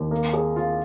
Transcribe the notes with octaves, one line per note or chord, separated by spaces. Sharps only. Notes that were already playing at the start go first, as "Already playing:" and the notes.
Already playing: D#2
A#3
G#4
F4